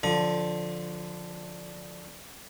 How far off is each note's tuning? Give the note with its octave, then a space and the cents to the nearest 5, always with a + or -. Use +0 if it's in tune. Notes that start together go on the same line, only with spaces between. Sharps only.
D3 +0 F3 +15 A#5 +45